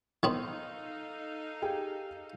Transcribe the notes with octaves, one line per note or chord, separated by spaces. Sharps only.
D#3 B3 C4 D#4 A4 F5
G4 G#4 G5